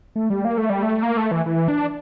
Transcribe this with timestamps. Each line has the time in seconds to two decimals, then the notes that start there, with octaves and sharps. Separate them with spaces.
0.16 A3
0.30 G3
0.45 A#3
0.58 A3
0.70 G3
0.82 A3
1.03 A#3
1.17 A3
1.31 E3
1.46 E3
1.68 D4